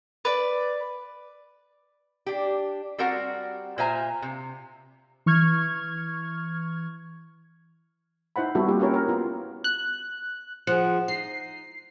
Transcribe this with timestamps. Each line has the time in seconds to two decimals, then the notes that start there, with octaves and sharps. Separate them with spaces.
0.25 B4 D5
2.26 D4 G4
2.98 G3 C4 F#4 A#4 F#5
3.78 A#2 F4 C5 E5 G#5 A#5
4.22 C3
5.26 E3 C#6 F6 G#6
8.36 D#4 E4 C5 F#5 B5
8.55 G3 B3 C4 E4 F#4 A4
8.68 A#3 F4 G4
8.80 C#4 E4 A#4 C#5 G5
8.94 A#4
9.08 B3 F4
9.64 F#6
10.67 F3 G#4 F#5
11.08 D#4 C7